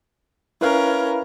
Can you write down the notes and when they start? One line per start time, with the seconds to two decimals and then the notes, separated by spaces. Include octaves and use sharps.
0.61 C#4 E4 A#4 B4 F5